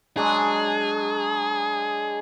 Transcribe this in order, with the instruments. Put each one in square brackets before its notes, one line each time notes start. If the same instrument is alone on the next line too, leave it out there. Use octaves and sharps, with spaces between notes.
[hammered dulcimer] F#3 G#3 D4 [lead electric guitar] G#4